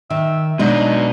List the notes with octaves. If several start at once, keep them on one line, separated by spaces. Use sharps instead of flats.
D#3 E5
B2 F#3 G#3 D4 D#4